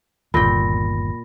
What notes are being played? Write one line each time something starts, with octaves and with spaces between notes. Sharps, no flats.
G1 D#2 A#2 G5 B5 A#6